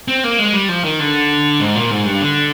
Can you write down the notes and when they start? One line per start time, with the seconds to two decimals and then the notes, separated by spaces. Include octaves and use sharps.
0.08 C4
0.24 A#3
0.39 G#3
0.54 G3
0.69 F3
0.84 D#3
0.99 D3
1.60 G#2
1.76 A#2
1.91 G#2
2.06 G2
2.21 D3